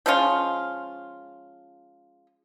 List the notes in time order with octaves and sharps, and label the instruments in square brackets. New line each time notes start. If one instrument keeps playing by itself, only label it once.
[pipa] F3 G#3 C#4 F4